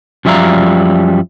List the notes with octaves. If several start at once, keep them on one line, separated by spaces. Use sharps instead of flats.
F#2 F3 G3 E5 F5 A#5